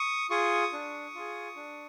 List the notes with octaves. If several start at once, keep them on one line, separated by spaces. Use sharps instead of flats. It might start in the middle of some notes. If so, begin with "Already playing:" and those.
Already playing: C#6 D#6
F4 G#4 C#6 D#6
D4
F4 G#4
D4